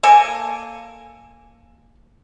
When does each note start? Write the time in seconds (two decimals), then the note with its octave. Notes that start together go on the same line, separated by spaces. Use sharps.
0.03 A#3 A4 G#5